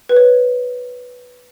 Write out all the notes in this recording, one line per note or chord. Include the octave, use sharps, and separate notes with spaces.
B4
C#5